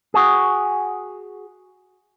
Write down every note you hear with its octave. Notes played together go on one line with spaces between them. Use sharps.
F#4 G#4